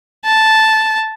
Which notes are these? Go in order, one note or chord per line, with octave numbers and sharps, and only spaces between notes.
A5